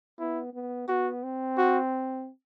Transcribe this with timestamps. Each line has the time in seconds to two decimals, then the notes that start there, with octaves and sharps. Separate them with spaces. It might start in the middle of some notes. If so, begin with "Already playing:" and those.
0.19 B3 E4
0.54 B3
0.88 B3 F#4
1.23 C4
1.57 F#4